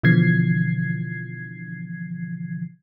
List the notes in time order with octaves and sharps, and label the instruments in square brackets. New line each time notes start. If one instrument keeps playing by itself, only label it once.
[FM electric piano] B2 D3 E3 F3 G#6 C7